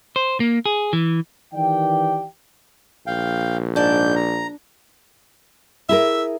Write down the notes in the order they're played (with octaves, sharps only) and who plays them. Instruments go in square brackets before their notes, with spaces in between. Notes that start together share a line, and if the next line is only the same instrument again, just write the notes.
[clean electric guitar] C5
A#3
G#4
E3
[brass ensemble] D#3 E3 G4 D5 G5
[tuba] A#1 [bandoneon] F5 G5
[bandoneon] G#2 G6 [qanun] D4 D5
[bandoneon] A#5
[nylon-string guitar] E4 G#4 A#4 [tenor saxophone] E5